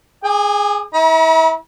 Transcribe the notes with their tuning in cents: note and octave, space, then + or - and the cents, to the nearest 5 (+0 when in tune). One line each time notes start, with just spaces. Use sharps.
G#4 +0 G#5 -40 D6 +35
E4 -35 A#5 +45